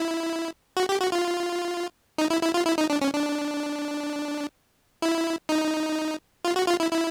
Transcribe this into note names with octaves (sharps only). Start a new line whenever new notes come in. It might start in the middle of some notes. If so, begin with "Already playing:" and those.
Already playing: E4
F#4
G4
F#4
F4
D#4
E4
E4
F4
E4
D#4
D4
C#4
D4
E4
D#4
F4
F#4
F4
E4
E4